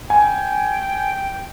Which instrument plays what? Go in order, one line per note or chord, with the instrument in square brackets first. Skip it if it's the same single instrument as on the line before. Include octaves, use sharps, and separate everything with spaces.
[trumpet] G5 [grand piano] G#5